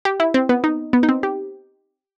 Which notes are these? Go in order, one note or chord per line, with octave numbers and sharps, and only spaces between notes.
G4
E4
C4
B3
D#4
B3
D#4
C4
G4